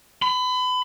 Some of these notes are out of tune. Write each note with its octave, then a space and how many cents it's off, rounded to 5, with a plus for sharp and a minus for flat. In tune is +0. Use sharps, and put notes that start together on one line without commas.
B5 +30